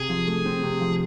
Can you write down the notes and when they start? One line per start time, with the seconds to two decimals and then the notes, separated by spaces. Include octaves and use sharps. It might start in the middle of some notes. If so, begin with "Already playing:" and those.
Already playing: C3 G#4
0.09 F3
0.27 A3
0.45 C4
0.63 C3
0.80 F3